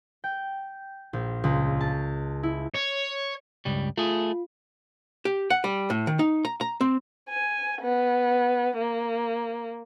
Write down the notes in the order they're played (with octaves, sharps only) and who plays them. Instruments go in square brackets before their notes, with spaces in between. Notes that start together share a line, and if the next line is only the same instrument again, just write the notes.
[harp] G5
A#1
C#2
A5
E4
[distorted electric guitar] C#5
[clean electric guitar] C#2 G2 G3
[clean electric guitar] A3 G#4 [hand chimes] F4
[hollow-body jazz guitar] G4
F#5
G3
A2
D#3
D#4
A#5
A#5
C4
[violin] G#5
B3
A#3